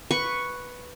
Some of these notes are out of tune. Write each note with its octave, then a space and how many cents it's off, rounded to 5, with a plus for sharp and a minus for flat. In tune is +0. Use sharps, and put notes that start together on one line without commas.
B4 +0 C#6 +0